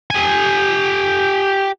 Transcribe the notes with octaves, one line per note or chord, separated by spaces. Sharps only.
G4 G#5